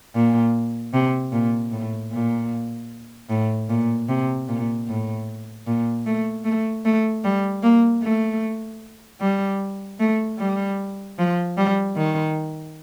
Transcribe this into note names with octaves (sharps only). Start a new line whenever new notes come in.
A#2
C3
A#2
A2
A#2
A2
A#2
C3
A#2
A2
A#2
A3
A3
A3
G3
A#3
A3
G3
A3
G3
F3
G3
D#3